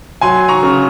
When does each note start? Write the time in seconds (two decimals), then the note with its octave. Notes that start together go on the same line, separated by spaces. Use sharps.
0.21 F#3 G#5 C6
0.48 A#5 C#6
0.63 C#3